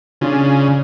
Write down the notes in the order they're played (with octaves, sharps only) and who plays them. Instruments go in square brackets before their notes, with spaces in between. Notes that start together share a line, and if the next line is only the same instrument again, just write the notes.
[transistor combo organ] C#3 [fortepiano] D4 F4